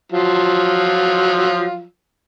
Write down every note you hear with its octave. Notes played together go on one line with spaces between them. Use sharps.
F3 F#3 F4